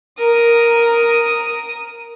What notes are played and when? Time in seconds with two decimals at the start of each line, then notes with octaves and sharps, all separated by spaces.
0.19 A#4 D#6